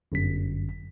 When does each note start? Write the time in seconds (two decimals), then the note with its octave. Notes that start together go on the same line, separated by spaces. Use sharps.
0.12 G1 F#2 B6